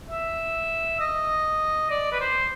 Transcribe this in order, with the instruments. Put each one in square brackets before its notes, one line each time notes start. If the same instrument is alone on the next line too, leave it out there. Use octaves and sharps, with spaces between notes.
[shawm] E5
D#5
D5
B4
C5